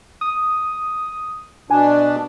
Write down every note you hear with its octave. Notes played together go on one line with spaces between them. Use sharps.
D#6
B2 D4 G#5